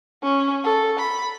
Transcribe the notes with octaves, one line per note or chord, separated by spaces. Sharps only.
C#4
A4
B5